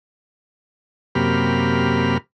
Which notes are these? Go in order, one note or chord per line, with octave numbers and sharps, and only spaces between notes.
F#2 C3 A#3 G4 B5 F6